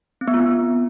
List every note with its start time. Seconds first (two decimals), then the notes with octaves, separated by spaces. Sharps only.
0.21 C4
0.28 B3
0.34 F4
0.40 B3